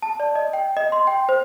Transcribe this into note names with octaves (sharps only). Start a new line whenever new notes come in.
A5
D5
D#5
G5
D#5
C6
G5
C5